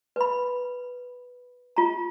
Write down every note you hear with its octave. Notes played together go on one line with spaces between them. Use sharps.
B4 B5
F4 A#5